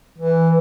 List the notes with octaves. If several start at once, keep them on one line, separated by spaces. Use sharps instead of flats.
E3